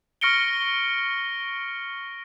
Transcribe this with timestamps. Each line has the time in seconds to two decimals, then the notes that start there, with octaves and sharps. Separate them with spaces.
0.21 C#6 F6 A#6 C#7 D7 G7